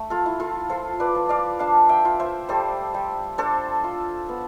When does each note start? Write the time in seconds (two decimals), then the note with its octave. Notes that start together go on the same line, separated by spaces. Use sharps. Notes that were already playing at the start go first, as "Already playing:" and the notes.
Already playing: A3
0.10 F4 A4
0.26 E4
0.40 F4 A4
0.69 F3 A4 C5
1.00 B4 D5
1.15 F3
1.29 D5 F5
1.59 D4 F5 A5
1.89 E5 G5
2.05 F4
2.20 C5 E5
2.49 G3 A4 C5
2.94 G3
3.38 D4 A4 C5
3.84 F4
4.29 B3